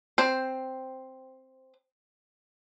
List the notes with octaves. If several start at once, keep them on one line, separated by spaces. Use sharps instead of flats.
C4 C5